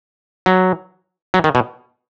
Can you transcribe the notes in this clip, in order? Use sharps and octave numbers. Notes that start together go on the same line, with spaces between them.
F#3
F#3
D#3
B2